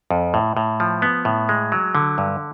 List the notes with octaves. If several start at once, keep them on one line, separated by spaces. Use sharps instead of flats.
F2
A2
A2
F3
B3
A2
G#3
F#3
D3
G2